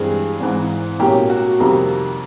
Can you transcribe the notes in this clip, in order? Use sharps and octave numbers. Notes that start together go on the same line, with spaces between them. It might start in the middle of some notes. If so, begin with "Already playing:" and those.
Already playing: G2 E3 G#3 C4 G#4
G#1 G#2 E3
B1 A2 F#3 A#3 C#4 G4
F#4
F2 C3 D#3 G3 A#3